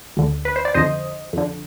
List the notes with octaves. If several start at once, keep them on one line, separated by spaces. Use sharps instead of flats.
D2 D3
B4
C5
D5
F2 D3 C5 D#5
F2 D3